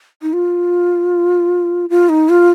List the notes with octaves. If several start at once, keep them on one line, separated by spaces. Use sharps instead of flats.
D#4
F4
F4
D#4
F4